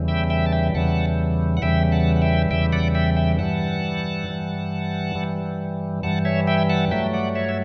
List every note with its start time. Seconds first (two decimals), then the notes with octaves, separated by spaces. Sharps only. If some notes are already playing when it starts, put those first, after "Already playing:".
Already playing: E2 C#3 E3 G3
0.08 E5 G5
0.30 E5 G5
0.46 A5
0.52 E5 G5
0.74 E2 C#3 E3 G3 F#5 A5
1.57 F#5
1.62 E2 C#3 E3 G3 E5 G5
1.92 F#5 A5
2.16 F#5
2.22 E5 G5
2.51 E2 C#3 E3 G3 E5 G5
2.72 D5 F#5
2.95 E5 G5
3.17 E5 G5
3.38 G2 E3 G3 F#5 A5
4.27 G2 E3 G3
5.15 G2 E3 G3
6.03 G2 E3 G3 F#5 A5
6.25 C#5 E5
6.47 E5 G5
6.70 F#5 A5
6.91 G2 F#3 A3 E5 G5
7.13 D5 F#5
7.35 C#5 E5
7.49 E5